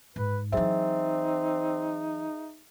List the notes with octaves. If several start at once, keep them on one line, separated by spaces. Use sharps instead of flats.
G#2 B4
E3 F#3 C4 D#4 G#4 E5